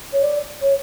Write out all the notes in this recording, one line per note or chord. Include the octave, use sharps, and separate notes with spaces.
C#5
D5
C#5